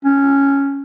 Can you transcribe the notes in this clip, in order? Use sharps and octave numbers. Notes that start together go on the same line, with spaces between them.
C#4